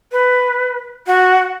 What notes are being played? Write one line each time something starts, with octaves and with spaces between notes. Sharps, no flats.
B4
F#4